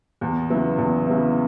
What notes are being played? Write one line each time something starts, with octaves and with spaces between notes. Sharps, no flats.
E2
C#3 F#3 B3 E4
E2
C#3 F#3 B3 E4